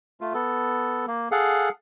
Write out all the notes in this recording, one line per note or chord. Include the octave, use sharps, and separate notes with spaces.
A3 F4
B3 A4
A#3
G#4 A4 F5 F#5